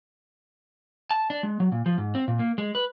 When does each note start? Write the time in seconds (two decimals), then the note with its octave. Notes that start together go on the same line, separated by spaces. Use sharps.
1.11 A5
1.30 D4
1.43 G#3
1.60 F#3
1.72 A#2
1.86 F3
1.98 G#2
2.15 C4
2.28 A#2
2.39 A#3
2.58 G#3
2.75 B4